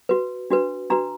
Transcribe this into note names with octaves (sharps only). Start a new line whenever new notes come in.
F#4 B4
D4 F#4 B4
D4 F#4 B4 A#5